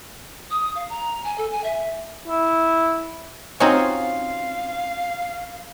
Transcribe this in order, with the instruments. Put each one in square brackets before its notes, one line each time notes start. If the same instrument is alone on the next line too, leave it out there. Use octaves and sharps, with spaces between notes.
[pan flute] D#6
F5
A#5
G#5
A4
G#5
E5
[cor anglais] E4
[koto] C4 F#4 C#5 [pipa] C#4 D#4 F4 [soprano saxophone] F5